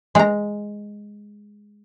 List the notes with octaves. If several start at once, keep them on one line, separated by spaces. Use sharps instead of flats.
G#3 A#5